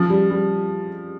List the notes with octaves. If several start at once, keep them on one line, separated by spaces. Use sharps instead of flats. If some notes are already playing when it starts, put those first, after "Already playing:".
Already playing: F3
G3
G3